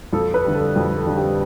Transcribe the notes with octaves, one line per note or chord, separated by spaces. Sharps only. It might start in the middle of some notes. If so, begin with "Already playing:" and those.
F2 A4
B4
D3 G3
A4
F2 G4
A4
D3 G3
G4